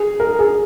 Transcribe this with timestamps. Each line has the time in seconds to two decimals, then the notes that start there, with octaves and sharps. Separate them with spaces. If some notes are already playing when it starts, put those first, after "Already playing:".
Already playing: G#4
0.20 A#4
0.39 G#4